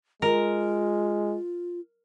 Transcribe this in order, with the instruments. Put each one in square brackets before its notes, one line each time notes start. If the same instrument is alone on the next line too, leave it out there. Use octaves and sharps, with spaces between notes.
[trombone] G#3 [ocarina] F4 [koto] A#4